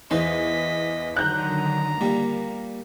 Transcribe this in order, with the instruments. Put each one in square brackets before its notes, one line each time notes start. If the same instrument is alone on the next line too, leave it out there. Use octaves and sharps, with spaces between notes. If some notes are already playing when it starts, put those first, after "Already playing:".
[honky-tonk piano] E2 [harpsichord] D#4 B4 C5 [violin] D#5 B6
[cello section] D3 D#3 F#3 [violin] A#5 [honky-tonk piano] F#6 G6
[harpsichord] A#2 G3 [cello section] A#3